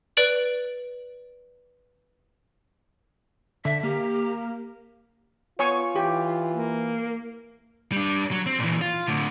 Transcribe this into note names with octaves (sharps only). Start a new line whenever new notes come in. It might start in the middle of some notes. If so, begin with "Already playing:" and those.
B4 D5 D7 F#7
D3 E5
A#3 G4
B3 F4 C#5 G#5 C#6
E3 G4
A#3
G3 D4
F#3
C4
A#2 E3
F4
A2 D3